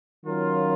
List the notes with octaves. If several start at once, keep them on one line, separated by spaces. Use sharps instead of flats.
D#3 F#3 C#4 F4 A#4